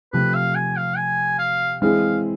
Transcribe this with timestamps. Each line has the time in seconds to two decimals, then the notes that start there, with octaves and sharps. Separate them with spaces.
0.13 C3 F3 A3 B4
0.35 F5
0.55 G#5
0.77 F5
0.97 G#5
1.39 F5
1.81 E3 G#3 C4 E4 G#4 F5